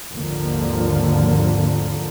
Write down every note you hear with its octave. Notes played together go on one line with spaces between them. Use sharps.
G#1 D#2 D3 F3 A#3